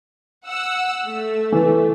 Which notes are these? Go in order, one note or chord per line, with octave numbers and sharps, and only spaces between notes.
F#5 E6
A3
E3